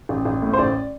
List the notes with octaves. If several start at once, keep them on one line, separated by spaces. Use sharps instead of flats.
A1
A1
A2
C5
A1 D5